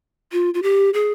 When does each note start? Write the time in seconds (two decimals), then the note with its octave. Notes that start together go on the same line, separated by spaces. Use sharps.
0.32 F4
0.54 F4
0.63 G4
0.94 G#4